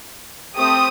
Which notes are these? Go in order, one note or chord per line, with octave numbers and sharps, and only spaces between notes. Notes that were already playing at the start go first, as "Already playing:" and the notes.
A3 C4 G4 D#6